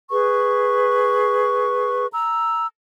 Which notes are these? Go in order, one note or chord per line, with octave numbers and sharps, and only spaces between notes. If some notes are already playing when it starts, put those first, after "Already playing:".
G#4 B4 C#6
A#5 E6